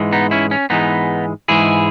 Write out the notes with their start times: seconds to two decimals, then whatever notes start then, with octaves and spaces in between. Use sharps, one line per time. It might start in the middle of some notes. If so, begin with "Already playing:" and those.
Already playing: G#2 E3 G#3
0.12 B3 D#4
0.31 C#4 E4
0.51 C#4
0.70 G#2 E3 G#3 B3 D#4
1.48 G#2 E3 G#3 E4 G#4